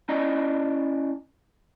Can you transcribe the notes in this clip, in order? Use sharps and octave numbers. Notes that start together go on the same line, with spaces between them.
C#4 E4 D5 D#5 A#5